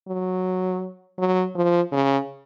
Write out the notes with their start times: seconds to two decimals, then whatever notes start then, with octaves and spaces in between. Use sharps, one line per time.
0.08 F#3
1.19 F#3
1.55 F3
1.92 C#3